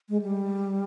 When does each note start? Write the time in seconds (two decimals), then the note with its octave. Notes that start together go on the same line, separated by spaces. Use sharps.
0.09 G#3
0.22 G3